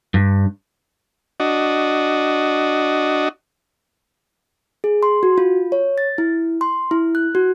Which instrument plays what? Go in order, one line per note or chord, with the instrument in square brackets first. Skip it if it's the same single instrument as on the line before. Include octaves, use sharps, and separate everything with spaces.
[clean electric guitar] G2
[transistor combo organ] D4 F#4 D#5
[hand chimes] G#4
C6
F#4
F4
C#5
A6
E4
C6
E4
F#6
F#4